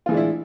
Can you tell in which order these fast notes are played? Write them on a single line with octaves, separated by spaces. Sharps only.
F4 E3 G#3 D4 E4